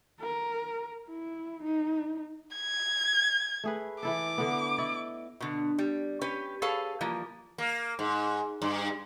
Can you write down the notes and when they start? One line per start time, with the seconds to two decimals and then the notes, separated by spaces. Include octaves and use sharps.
0.21 A#4
1.09 E4
1.63 D#4
2.56 G#6
3.64 A3 G#4 B4
4.03 E3 E4 A4 D6
4.38 D3 B3
4.78 E4 D5 D#5
5.41 B2 D3
5.78 G3
6.21 C#4 G4 B4
6.62 G#4 A4 B4 C#5 F5 A5
7.01 E3 F3 G3 A#3
7.58 A#3
7.99 G#2
8.62 G2